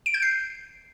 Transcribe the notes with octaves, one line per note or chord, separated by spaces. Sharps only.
D7
G6
C7